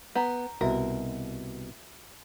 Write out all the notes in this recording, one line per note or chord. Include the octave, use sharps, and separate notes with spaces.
B3 A#5 G6
C2 B2 F#4 A#4 E5